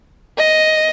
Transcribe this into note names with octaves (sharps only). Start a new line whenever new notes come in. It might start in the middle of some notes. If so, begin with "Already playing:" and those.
D#5